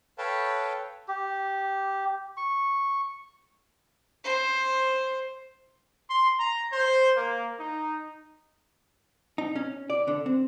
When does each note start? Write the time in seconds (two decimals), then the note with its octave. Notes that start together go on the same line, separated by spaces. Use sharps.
0.18 A4 B4 C#5 F5 G5 A5
1.08 G4
2.37 C#6
4.24 C5
6.10 C6
6.39 A#5
6.73 C5
7.15 A#3
7.59 D#4
9.38 D#4
9.56 C#4
9.90 D5
10.08 D3
10.26 C4